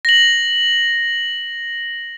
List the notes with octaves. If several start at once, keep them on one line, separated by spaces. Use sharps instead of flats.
A#6 F#7